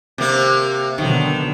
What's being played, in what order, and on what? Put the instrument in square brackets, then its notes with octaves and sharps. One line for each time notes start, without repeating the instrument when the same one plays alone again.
[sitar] C3 A#3
[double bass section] B2 D3 F#3 [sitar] D#3